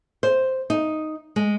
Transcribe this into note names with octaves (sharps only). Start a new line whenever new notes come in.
C5
D#4
G#3